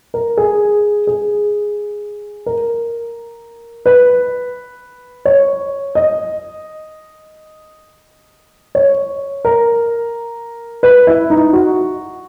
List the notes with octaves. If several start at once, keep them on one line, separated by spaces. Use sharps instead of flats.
A#4
G#4
G#4
A#4
B4
C#5
D#5
C#5
A#4
B4
E4
D#4
F#4